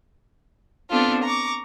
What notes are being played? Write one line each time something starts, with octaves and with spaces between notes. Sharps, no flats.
B3 C4 D4 F4 A4
A#5 C#6 D6